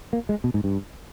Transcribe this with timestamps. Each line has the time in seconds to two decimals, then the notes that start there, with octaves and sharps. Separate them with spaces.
0.13 A#3
0.29 G#3
0.44 B2
0.54 G#2
0.64 G2